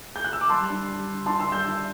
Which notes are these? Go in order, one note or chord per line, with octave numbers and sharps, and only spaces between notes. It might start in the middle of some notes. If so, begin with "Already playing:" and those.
G6
F#6
E6
D6
G3 A5 C6
D4
G3
D3
D4 A5 C6
C6 E6
G3
E6 G6
D4